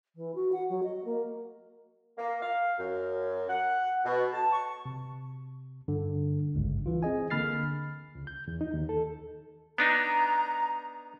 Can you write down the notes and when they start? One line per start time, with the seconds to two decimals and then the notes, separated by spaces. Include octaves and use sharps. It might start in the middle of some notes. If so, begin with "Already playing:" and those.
0.16 E3
0.35 F#4
0.52 F#5
0.69 F#3
0.83 D#5
1.05 A#3
2.18 A#3
2.41 F5
2.78 F#2
3.49 F#5
4.05 B2
4.32 A5
4.53 C#6
4.86 C3
5.88 G2 D3
6.54 G#1 C#2 G2
6.86 E3 F4
7.03 C4 G#4 D#5 G#5
7.30 D3 A#3 B5 F6 A6 C7
8.15 C#2
8.27 G6
8.48 E2
8.61 D#4
8.74 D#2
8.89 A4
9.78 B3 D4 D#4 A#5